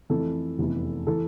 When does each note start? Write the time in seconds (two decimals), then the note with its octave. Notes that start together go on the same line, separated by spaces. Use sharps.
0.10 F2 E3 A3 A4
0.58 F1 E2 E3
1.07 E3 A4